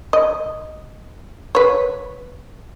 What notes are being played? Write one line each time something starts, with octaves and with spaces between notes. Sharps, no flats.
D#5
B4 C#5